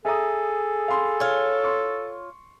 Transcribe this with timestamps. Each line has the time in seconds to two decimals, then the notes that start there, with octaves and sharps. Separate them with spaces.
0.05 G#4 A4 E5 A#5 D#6
0.88 F5 B5 C6
1.20 F4 C#5
1.64 C6 C#6